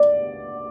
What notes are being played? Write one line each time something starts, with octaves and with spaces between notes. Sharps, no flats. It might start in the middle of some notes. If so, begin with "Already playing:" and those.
Already playing: D5